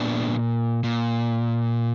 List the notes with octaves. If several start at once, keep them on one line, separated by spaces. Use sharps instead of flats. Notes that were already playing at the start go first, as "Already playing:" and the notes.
Already playing: A#2 B3 D4
A#2